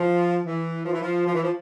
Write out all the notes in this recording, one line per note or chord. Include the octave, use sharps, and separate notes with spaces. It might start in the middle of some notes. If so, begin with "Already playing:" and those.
Already playing: F3
E3
F3
E3
F3
F3
E3
F3